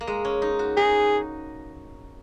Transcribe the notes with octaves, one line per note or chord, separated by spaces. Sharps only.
A#3
G#3
C#4
D#4
F#4
D#4 G#4